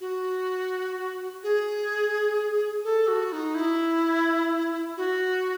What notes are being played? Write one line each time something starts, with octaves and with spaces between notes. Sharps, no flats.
F#4
G#4
A4
F#4
D#4
E4
F#4